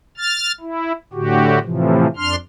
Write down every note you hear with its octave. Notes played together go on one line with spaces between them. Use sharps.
F6 A6
E4
A2 D3 F#4 G4
A2 C3 E3 F3
F2 D4 C6 F6